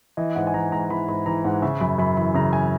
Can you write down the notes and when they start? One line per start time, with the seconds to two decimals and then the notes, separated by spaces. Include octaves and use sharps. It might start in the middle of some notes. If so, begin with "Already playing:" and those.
0.17 E3 D#5
0.36 G#2 F#5
0.47 G#5
0.54 E3 A#5
0.72 G#2 A#5
0.90 E3 B5
1.08 G#2 B5
1.26 E3 A#5
1.44 G#2 F#5
1.62 C#3 E5
1.81 F#2 B5
1.98 F#2 B5
2.17 E3 B5
2.34 C#3 A#5
2.53 G#5